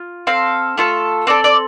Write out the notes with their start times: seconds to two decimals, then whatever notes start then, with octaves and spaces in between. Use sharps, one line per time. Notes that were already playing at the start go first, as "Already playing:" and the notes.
Already playing: F4
0.27 C4 A4 F5
0.77 A3 F4 A4
1.27 C4 A4 D5
1.44 D5